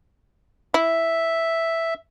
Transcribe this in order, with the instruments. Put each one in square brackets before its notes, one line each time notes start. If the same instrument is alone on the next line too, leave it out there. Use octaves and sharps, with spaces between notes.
[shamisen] E4 [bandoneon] E5